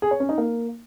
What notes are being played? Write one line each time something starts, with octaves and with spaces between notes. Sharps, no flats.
G#4
C#5
C#4
D#4
A#3